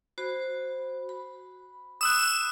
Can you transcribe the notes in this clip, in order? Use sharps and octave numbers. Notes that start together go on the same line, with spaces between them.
F#4 C5 B5
B5
B5 D#6 E6 F#6 E7